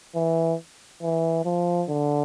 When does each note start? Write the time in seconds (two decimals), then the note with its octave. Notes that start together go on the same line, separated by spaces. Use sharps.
0.15 E3
1.02 E3
1.45 F3
1.89 D3